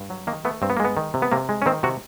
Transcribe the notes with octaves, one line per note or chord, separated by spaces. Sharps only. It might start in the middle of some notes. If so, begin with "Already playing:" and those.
Already playing: G2
F#3
D#3 A#3
A3 B3
G2 C4
B3
A#3
G#3 B3
D#3
C3
B3
C3 A#3
G#3
C#4
D#3 C4
C3 F#4